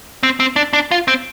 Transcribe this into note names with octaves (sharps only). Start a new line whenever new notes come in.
C4
C4
D4
D4
F4
C4